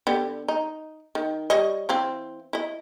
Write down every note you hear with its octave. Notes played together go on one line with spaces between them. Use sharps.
D3 B3 G4
D#4
D#3
G3 C#5 D#5
E3 C4 F5
E4 D#5